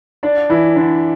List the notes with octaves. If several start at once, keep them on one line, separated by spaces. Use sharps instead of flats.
D4 D5
E3 E4
D3 D4